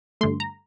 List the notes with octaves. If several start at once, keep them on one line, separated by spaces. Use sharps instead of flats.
G2 D3 A3 C6
A#5